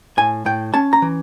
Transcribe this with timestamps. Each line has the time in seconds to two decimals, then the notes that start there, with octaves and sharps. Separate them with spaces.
0.17 A2 G#5
0.46 A2 G5
0.74 C#4 A5
0.93 A#5
1.02 E3